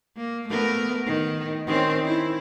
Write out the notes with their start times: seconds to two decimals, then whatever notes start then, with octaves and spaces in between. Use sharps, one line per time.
0.17 A#3
0.49 A3 B3 A#4
1.06 D#3
1.67 D#3 C4 C#4
2.02 E4